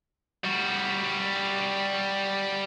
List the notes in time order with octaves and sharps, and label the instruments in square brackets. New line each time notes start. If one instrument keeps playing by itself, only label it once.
[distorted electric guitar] G3 F#4